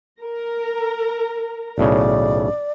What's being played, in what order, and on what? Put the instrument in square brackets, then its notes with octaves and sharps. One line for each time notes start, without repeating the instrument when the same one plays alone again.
[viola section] A#4 A#5
[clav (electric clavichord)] B1 A2 C#3 [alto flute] D5